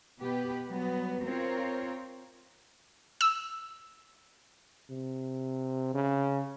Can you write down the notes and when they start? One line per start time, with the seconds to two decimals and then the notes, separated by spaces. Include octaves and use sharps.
0.19 B2 B3 G4 B4
0.68 F#3 G3 B3
1.25 C4 F4 A#4 C#5
3.21 E6
4.90 C3
5.94 C#3